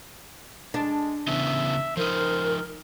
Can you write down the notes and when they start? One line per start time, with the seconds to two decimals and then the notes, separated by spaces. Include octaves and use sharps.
0.74 G#3 D4
1.28 C#3 E3 B3 E5
1.97 F3 D#4 A#4 C5